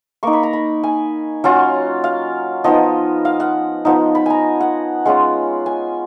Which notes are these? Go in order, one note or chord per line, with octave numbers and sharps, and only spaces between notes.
A#3 D#4 C#6
B5
A#5
B5
G#5
F#3 C#4 F4 F#5
F5
F3 B3 D#4 D#5
F5
F#5
F3 B3 D#4
B5
G#5 A#5
F#5
G#3 C#4 F4 F#5
G#5